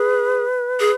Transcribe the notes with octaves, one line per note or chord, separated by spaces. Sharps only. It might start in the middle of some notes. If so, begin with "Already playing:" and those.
Already playing: G#4 B4
G#4